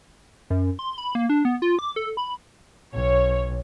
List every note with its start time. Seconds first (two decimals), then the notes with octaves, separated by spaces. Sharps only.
0.50 F#2
0.79 C6
0.98 B5
1.15 A#3
1.30 D4
1.45 B3
1.62 F4
1.79 D6
1.96 A4
2.17 B5
2.94 B1 C#5